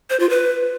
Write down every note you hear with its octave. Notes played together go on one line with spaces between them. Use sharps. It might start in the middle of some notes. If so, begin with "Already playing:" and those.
C5
F4
B4